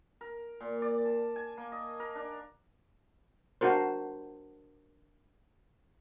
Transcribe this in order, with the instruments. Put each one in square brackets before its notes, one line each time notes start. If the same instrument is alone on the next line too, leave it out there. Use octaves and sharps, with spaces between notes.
[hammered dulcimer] A#4
A#2
D5
A5
G#5
A#3
D#5
A#4
D4
[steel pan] D4 F#4 A#4 C5